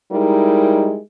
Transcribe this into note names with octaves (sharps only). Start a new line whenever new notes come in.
G3 G#3 D#4 E4 G4 A#4